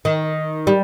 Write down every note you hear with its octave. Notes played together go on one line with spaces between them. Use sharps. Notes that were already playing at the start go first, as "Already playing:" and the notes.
D#3
G3